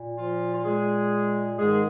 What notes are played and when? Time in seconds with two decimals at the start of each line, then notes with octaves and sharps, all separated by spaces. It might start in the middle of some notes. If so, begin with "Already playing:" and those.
Already playing: A#2
0.16 F3 F4
0.54 F4
0.64 G#3 G#4
1.58 G#2 D#3 G#3 G#4